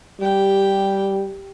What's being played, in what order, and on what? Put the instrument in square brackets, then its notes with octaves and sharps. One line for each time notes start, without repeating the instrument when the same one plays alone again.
[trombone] G3 [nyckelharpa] G4 G5